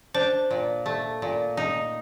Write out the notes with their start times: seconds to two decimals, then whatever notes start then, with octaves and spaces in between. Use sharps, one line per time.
0.14 D4 C5
0.51 A#2
0.86 A3
1.22 A#2
1.57 D#4